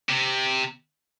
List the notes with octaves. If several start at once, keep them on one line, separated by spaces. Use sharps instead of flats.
C3